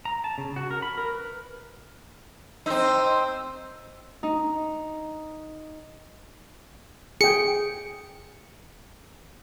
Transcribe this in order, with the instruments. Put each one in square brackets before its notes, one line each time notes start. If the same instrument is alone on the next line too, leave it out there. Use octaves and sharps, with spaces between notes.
[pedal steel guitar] A#5
A5
C#3
F#4
A#4
B5
A#4
B4
[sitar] C4 D#4 [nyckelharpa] C5 [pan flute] E6
[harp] D#4
[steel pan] G#4 G5 [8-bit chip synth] C#7